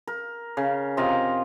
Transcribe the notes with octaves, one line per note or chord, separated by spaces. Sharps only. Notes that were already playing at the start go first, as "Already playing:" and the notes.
A#4
C#3
C3 F4 D#5 A#5